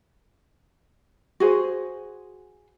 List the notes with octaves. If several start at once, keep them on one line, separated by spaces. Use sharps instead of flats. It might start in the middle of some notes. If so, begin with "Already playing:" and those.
F#4 G#4 C5